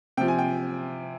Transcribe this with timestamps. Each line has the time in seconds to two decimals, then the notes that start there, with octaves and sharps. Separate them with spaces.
0.17 C3 G5
0.21 F3
0.28 G#5
0.38 G5